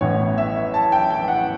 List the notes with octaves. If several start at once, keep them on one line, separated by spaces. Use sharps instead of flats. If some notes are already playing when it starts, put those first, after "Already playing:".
A1 A2 E3 B3 C#5
E5
A5
G5
G5
F#5